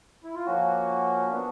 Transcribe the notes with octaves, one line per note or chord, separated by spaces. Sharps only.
E4
F4
F3 A#3 C#4 F#4
F#3 B3 D4